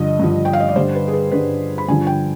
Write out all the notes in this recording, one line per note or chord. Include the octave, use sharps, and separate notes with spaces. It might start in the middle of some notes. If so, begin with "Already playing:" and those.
Already playing: G2 D3 F3 D#5
G2 D3 F3
G5
F5
D#5
D5
G2 D3 G3 C5
B4
G#4
B4
G2 D3 G3 B4
B5
G2 D3 F3 G#5
G5